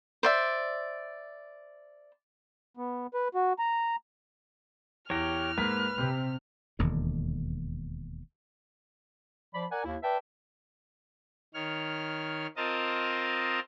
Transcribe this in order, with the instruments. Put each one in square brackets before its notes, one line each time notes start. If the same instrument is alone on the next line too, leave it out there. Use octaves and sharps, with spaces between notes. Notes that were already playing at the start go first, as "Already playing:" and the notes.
[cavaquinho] C5 D5 E5
[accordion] B3
B4
F#4
A#5
[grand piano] E2 A#6 [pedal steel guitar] G4 C#5 [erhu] F6
[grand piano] G#2 A#3 B6 [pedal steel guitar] B4
[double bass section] C3 [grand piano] C4 G4
[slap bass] E1 D#2 D3
[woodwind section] F3 D5 B5
A#4 D5 F#5 G#5
D#2 E4
B4 D5 E5 G5 A5
[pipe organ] D#3 C#5 F6
C4 F4 A#4 D#5 A5